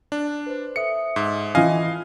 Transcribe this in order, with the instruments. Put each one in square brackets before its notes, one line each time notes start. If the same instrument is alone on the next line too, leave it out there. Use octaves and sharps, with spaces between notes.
[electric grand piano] D4
[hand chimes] B4 C5
[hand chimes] A4 E5 D#6 [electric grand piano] C#7
[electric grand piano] G#2
[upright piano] E3 F3 [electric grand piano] D#5 F5 G#5